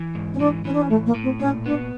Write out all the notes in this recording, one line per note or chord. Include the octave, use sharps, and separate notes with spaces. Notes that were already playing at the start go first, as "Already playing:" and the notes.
Already playing: E3
G#2
C#4
E3 D4
E3 C#4
D4
C#4
A2 A3
A#3
A2
C4
A#2 C#4
B3 D4